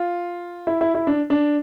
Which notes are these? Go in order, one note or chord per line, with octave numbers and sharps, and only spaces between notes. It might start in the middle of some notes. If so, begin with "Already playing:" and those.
Already playing: F4
E4
E4
E4
D4
D4